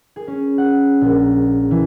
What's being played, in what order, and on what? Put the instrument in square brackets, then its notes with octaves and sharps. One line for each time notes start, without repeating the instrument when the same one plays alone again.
[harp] G#4
C#4
F#5
A#1
E3